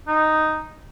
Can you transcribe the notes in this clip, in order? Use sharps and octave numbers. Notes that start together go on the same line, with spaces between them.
D#4